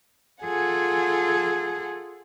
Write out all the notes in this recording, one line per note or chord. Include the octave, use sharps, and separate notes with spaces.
F4 G#4 A4 F#5 G#5